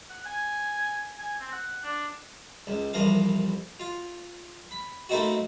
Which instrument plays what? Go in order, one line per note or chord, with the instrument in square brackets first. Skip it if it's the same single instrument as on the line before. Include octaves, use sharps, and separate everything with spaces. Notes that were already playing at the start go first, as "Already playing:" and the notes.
[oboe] F#5
G#5
G#5
C4
F#5
D4
[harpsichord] C#2
C2 F2 E3 A#4 F5
F4
B5
A3 A#3 C4 D#4 E4 F#4